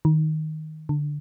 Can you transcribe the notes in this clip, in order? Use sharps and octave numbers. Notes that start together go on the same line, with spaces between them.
D#3
D3